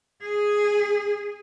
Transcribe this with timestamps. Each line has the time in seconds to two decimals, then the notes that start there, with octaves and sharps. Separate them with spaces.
0.23 G#4